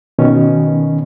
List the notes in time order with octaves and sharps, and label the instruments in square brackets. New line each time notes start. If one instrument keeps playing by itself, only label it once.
[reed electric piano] B2 D#3 C#4